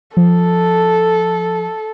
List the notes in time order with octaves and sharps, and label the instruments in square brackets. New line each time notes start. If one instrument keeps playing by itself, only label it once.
[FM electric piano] F3 [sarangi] A4